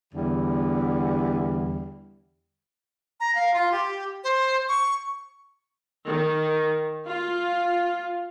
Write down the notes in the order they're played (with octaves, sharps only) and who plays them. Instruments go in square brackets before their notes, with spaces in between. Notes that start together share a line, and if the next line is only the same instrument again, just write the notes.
[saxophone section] E2 D3 G3
[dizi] A#5
F5
F4
G4
C5
C#6
[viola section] D#3
F4